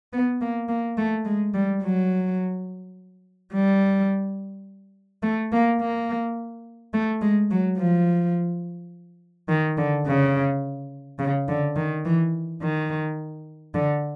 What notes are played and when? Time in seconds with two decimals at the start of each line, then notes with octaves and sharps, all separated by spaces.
0.13 B3
0.41 A#3
0.69 A#3
0.98 A3
1.25 G#3
1.54 G3
1.83 F#3
3.53 G3
5.23 A3
5.52 A#3
5.81 A#3
6.94 A3
7.21 G#3
7.51 F#3
7.78 F3
9.49 D#3
9.78 D3
10.06 C#3
11.19 C#3
11.48 D3
11.76 D#3
12.05 E3
12.62 D#3
13.74 D3